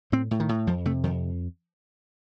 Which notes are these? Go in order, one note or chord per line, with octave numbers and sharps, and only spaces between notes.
A2 C4
A2
D#3
A2
F2 F3
C3 A3
F2 D#3